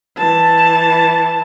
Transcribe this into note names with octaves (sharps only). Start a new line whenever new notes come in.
E3 A5